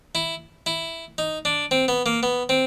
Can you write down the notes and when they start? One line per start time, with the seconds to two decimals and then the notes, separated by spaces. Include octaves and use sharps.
0.15 E4
0.66 E4
1.18 D#4
1.45 D4
1.71 C4
1.88 B3
2.06 A#3
2.23 B3
2.49 C4